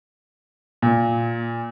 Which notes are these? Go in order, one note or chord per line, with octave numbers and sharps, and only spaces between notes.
A#2